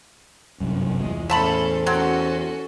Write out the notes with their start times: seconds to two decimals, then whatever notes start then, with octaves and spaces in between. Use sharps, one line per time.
0.60 G1 C2 F#2
1.00 E2 F3 G#3
1.30 A2 C#4 A4 C5 E5 A5 B5
1.86 F#3 C4 C#4 F#4 A4